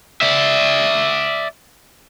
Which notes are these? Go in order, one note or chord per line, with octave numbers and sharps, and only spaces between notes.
D5 E5